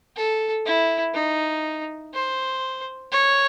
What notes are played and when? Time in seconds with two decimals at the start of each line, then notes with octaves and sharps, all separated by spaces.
0.16 A4
0.66 E4
1.14 D#4
2.14 C5
3.12 C#5